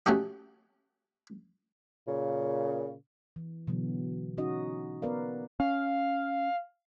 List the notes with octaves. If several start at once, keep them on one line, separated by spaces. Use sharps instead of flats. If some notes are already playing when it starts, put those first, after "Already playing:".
A3 C#4 F#4 G4 D#5
A#2 C#3
E3
B2 D3 E3 F#3 B3
C#4 D#4 F#4 D#5
B3 A#4 B4 D5 F5
C#4 F5